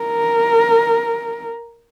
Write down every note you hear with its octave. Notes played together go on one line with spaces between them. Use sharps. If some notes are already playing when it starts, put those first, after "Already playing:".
Already playing: A#4